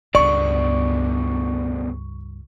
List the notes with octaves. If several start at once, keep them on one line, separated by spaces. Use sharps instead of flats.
C#2 G2 B2 D3 D5 C#6